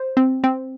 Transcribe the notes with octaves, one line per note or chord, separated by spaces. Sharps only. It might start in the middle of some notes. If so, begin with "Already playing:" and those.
Already playing: C5
C4
C4